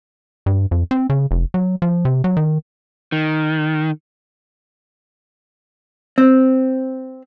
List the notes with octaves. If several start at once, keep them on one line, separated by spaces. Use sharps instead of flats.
G2
F2
C4
C#3
F1
F#3
F3
C3
F#3
D#3
D#3
C4